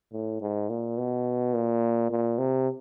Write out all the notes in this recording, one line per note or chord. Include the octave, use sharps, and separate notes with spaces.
A2
G#2
A#2
B2
A#2
A#2
C3